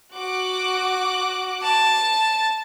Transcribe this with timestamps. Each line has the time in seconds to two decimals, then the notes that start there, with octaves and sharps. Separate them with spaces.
0.15 F#4 D6 F#6
1.63 A5